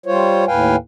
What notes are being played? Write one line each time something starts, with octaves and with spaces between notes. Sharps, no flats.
G3 F4 C5 C#5
D#2 A2 B4 F5 G5 G#5